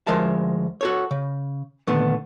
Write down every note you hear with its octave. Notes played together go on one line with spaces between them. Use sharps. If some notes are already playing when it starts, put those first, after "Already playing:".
D2 F3 G#3 A#4 E5 A5
F#4 A4 C#5
C#3
A#2 D3 D#3 A3 B3